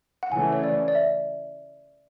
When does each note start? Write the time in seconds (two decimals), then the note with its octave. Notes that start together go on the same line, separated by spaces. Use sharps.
0.23 F#5
0.31 C#3 E3 A3 G#5
0.53 C#5
0.63 D5
0.88 D5
0.95 E5